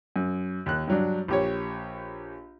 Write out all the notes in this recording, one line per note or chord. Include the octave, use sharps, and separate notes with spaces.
F#2
D#2 F#6
G2 F#3 D4
A#1 G4 C#5